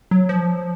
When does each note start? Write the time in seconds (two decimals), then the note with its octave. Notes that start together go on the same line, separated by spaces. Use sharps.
0.11 F#3
0.29 F3